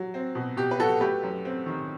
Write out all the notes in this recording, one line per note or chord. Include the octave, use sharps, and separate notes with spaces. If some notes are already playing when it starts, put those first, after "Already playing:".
Already playing: F#3
C4
B2
B2 G4
B4
F#3 F#4 A4
A3 G4 B4
F#2
C4
D#3